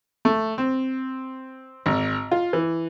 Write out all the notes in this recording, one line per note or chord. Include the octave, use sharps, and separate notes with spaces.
A3
C4
G#1
F4
E3